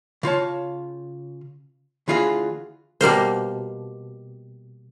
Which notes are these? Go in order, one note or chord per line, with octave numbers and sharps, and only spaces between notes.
C#3 F4 C#5 A5
D2 E3 F4 F#4 G#4
B2 G3 A#3 C5